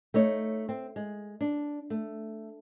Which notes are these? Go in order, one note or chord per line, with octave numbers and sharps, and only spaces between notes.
A3 D#4 C#5
C4
G#3
D4
A3